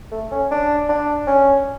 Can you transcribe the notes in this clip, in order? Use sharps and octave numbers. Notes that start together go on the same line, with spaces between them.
A3
C#4
D4
D4
C#4